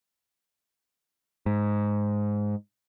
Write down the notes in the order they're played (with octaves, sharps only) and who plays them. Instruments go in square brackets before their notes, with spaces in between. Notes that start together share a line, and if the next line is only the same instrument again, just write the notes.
[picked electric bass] G#2